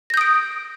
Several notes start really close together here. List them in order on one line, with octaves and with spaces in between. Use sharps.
A#6 G6 D#6 D7